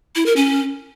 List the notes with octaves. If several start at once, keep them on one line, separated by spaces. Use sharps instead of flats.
E4
A#4
C#4